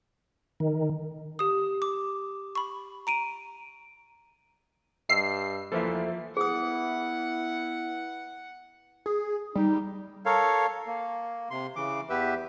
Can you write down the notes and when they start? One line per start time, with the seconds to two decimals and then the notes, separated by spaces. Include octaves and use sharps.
0.60 D#3
1.39 G4 D#6
1.82 D6
2.55 B5 C#6
3.07 A#5 D7 D#7
5.09 G2 D#5 E6 C7
5.72 E3 F3 A#3 F4 A4 C5 E5
6.37 B3 E4 G#4 F#5 D#6
9.06 G#4
9.55 G3 D#4
10.26 A4 A#4 C#5 F5
10.87 A#3
11.51 C3 C6
11.76 C#3 E3 D6
12.10 E2 B3 G4 B4 E5